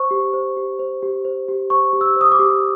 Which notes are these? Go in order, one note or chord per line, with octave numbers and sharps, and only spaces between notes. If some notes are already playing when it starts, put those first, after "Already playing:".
Already playing: C5 C#6
G4
C5
G4
C5
G4
C5
G4
C5 C#6
G4
E6
C5 D#6
D6
G4